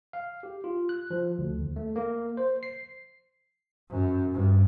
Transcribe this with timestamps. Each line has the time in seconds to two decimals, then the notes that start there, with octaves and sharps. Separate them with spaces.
0.13 F5
0.43 G4
0.64 F4
0.89 F#6
1.10 F3
1.38 D2
1.58 D#2
1.76 A3
1.96 A#3
2.37 C5
2.63 C7
3.89 F#2
4.33 G2